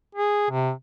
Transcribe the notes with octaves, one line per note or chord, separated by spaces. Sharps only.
G#4
C3